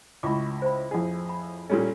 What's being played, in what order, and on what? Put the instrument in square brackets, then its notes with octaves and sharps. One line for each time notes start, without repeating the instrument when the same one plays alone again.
[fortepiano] C#2 A2 [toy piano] B5 C#6 D6
[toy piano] C5 B5
[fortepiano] F2 A2 G#4
[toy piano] B5
[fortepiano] A#2 G3 C#4 [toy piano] A4